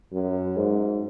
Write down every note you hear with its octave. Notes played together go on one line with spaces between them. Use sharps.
F#2
G#2